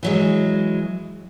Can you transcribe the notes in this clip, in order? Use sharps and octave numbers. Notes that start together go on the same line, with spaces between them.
E3 F#3 G#3